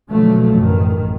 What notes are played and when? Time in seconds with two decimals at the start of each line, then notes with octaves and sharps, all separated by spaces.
0.10 B2 D3 F3 F#3 A3
0.54 A1 F#2 D#3